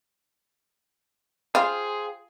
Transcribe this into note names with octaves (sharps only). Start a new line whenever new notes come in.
F4 G#4 C5 F5 G5